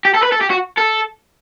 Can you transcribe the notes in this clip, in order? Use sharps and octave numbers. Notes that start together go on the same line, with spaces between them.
G4
A4
B4
A4
G4
F#4
A4